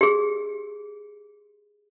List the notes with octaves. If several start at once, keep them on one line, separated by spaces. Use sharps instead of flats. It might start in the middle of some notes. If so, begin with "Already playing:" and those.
G4 G#4